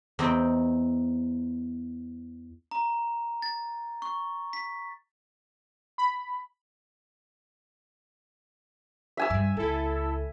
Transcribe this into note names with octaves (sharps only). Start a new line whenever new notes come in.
E2 C4 D#4 G5
A#5
A6
C#6
B6
B5
E5 G#5 E6
G2 G3
C#2 E4 A4